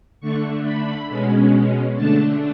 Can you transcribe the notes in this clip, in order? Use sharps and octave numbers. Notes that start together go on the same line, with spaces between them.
D3 A3 D4 C#6
B5
B2 G#3 C#4
D3 A3 D4 A5